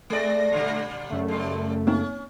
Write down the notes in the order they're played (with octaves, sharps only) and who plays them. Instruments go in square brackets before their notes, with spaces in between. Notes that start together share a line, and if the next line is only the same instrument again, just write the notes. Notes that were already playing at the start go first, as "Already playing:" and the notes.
[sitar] G#3 D5 [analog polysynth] A3 A#6
[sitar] A#2 D3 G3
[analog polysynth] F#2 C#3 A3
[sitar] G2 G3
[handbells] A#3 C4 D#4 [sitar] C#4